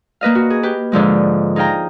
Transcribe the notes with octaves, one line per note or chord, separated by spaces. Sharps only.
A#3 B4 D#5 F5
F#4
G#4
G4 B4
G#2 D3 F3 G#3
D#4 G#4 F5 G5 A#5